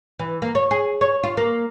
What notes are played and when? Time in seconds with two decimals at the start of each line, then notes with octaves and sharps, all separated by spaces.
0.19 E3
0.42 A#3
0.55 C#5
0.71 G#4
1.01 C#5
1.23 F4
1.37 A#3